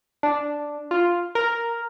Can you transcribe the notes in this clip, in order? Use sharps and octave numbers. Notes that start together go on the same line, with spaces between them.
D4
F4
A#4